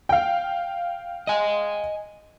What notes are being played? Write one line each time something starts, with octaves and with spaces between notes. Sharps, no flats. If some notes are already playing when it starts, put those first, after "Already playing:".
F5 G5
D#5 G#5